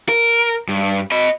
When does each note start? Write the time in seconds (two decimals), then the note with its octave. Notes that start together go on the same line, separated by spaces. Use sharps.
0.09 A#4
0.69 G2
1.12 D#5 B5